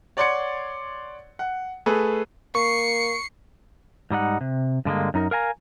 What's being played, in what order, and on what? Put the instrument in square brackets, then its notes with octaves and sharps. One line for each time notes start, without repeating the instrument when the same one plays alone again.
[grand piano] C#5 D5 F#5 C6 G#6 C#7
F#5
A3 G#4 A4 B4
[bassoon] A#3 [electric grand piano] C#6 [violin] C7 C#7
[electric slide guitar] G#2 G3 D#4 F#5
C3
G2 D3 G#3 A#3
F#2 D#4 A#4
A#4 F5 G#5 A#5